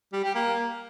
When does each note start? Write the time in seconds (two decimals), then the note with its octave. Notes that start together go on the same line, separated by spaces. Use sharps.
0.13 G3
0.24 G4
0.35 A#3